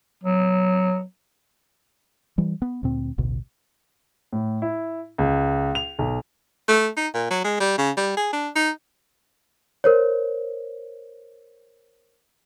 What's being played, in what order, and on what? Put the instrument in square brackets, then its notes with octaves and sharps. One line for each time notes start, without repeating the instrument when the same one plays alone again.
[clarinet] F#3
[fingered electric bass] E3 G3
B3
D2 A#2 C4
A1 D2 B2
[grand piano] A2
E4
C#2
F7
B1
[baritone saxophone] A3
D#4
A#2
F#3
G#3
G3
C#3
G3
G#4
D4
D#4
[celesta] A#4 C5 C#5